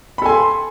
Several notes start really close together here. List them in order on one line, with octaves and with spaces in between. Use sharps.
B5 A4 G#5 C6